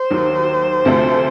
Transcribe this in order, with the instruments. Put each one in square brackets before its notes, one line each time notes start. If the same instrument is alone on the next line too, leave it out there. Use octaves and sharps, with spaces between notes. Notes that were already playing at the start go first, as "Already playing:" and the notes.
Already playing: [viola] C5
[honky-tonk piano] D#2 D#3 F#3
D2 C3 F3 A3